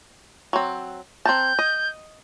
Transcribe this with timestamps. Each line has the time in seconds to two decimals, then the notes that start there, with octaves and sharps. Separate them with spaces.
0.53 F#3 C4
1.25 C4 A#4 A5 G6
1.59 D#5